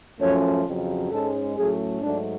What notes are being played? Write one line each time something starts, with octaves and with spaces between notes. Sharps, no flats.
F#2 F3 A3 C#4 C#5
F2 C#3 F#3
G#2 G#3 C#4 A4
A2 F#3 A3 C#4 G#4
G#2 F#3 A3 D4